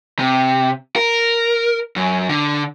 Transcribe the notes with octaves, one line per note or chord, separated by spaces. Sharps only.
C3
A#4
F#2
D3